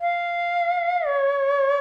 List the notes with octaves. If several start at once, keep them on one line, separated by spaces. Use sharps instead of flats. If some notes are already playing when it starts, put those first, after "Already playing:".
F5
C#5